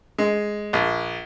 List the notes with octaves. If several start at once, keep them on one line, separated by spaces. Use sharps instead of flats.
G#3
A#1